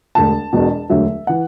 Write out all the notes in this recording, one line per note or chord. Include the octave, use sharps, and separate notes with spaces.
E1 D2 D3 A5
E1 E2 B2
E1 D2 D3 F#3 E5
E3 F#5